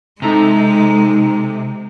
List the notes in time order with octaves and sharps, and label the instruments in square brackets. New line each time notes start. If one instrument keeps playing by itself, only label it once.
[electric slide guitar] C3 [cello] G#3 [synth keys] D#4 A4 A#5